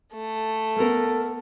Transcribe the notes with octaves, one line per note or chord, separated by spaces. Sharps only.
A3
A#3 B3 A4 A#4